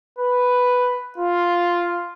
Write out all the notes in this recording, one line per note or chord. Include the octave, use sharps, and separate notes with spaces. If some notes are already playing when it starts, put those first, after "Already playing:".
B4
F4